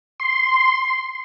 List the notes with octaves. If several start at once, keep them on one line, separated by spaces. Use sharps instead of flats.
C6